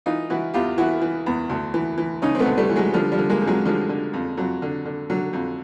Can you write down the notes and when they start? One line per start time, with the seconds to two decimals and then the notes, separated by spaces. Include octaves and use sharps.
0.06 E3 D#4 F4
0.30 E3 E4 F#4
0.54 E2 F4 G4
0.78 E3 E4 F#4
1.02 E3
1.26 E2
1.49 D2
1.74 E3
1.98 E3
2.22 C#3 C#4 D#4
2.35 C4
2.39 A3 B3
2.46 D2
2.57 G3 A3
2.69 E3
2.75 F#3 G#3
2.94 D3 F3 G3
3.12 F3 G3
3.18 D3
3.30 G#3 A#3
3.42 F2
3.47 F#3 G#3
3.65 D3 F3 G3
3.89 D3
4.13 F2
4.37 F2 F#3
4.62 D3
4.85 D3
5.10 D3 F#3
5.33 F2